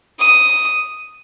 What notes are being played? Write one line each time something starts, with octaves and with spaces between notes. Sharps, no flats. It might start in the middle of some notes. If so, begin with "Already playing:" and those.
D#6